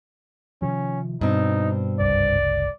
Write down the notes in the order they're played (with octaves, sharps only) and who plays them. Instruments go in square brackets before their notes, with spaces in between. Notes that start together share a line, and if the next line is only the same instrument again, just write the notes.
[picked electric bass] C3 D#3 F3 [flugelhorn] C#4
[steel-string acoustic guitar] G2 C4 [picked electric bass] B2 [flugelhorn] D#4
[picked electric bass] F#1 C2 [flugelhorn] D5